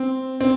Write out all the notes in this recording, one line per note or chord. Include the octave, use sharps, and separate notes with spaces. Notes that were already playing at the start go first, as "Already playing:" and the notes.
Already playing: C4
C4